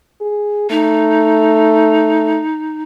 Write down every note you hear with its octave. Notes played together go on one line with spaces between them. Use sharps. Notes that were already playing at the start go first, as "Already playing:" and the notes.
G#4
A3 D#4